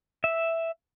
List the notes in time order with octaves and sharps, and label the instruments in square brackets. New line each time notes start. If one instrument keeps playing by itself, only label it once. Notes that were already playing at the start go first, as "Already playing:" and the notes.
[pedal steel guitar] E5